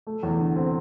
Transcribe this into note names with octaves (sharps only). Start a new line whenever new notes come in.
A3
E2
D3
C4